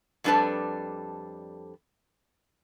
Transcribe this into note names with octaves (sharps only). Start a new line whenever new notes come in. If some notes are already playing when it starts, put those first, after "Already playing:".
F2 G3 D4 A4 B4 A5